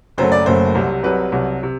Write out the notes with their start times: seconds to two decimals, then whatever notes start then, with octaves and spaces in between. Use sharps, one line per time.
0.18 F#1 F#2 F#3 A3 C5
0.32 D5
0.46 F#1 F#2 F#3 A3 C5
0.75 C2 C3 F#3
1.03 C2 C3 F#3 B4
1.32 C2 C3 F#3
1.63 C3